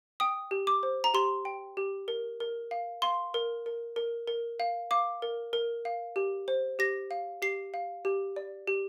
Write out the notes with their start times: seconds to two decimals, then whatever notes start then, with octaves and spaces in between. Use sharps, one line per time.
0.20 G5 D#6
0.51 G4
0.67 D6
0.83 C5
1.04 A#5
1.14 G4 C6
1.45 G5
1.77 G4
2.08 A#4
2.40 A#4
2.71 F5
3.02 F5 C6
3.34 A#4
3.66 A#4
3.96 A#4
4.28 A#4
4.60 F5
4.91 F5 D6
5.22 A#4
5.53 A#4
5.85 F5
6.16 G4
6.48 C5
6.79 G4 A#6
7.11 F5
7.42 G4 C7
7.74 F5
8.05 G4
8.36 D5
8.67 G4